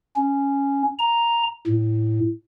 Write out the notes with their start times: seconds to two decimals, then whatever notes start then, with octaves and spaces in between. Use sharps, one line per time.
0.16 C#4
0.99 A#5
1.67 A2